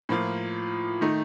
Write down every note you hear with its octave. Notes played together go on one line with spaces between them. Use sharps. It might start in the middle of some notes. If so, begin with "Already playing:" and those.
A2 F3 A#3 F4
D#3 A3 D#4